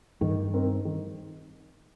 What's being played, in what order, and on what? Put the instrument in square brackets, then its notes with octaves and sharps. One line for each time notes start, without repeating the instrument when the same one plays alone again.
[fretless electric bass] G2 [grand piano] D#3
[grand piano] C4 D#4 A#4
D#3